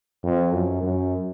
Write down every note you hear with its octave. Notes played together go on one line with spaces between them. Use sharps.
F2
F#2
F#2